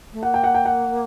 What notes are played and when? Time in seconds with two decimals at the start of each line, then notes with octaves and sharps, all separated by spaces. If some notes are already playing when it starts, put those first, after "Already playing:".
0.13 A3
0.23 A#3 F#5
0.34 G5
0.44 F#5
0.54 G5
0.66 F#5